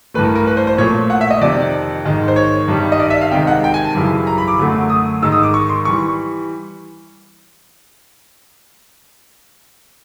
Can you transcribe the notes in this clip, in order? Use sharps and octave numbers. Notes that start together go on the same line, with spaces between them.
G2 E3 A3 B4
A#4
A#4
B4
C5
C5
A#2 F3 A3 C#5
F#5
E5
D#5
F2 C3 D#3 D5
G#2 D#3 G#3
C5
C#5
G2 D#3 G3
D#5
D5
E5
F5
C3 D#3 G#3 G5
F#5
G5
G#5
A5
F#2 C#3 E3 G3
A#5
B5
D6
F#2 D3 F#3 A3
D#6
G#2 D#3 G#3 E6
D#6
D6
C#6
C6
E3 G3 C#6